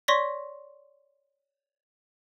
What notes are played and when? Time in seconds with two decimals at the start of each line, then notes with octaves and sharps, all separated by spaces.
0.08 C#5 D5 C6 C#6 A#6 B6